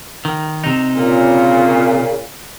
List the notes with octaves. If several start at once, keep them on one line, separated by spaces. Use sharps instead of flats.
D#3
C3 D#4
A#2 C#3